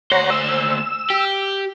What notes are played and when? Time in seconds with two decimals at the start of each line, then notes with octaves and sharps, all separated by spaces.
0.12 D2 C5 C#5 F#5 A#5
0.30 E6
1.10 G4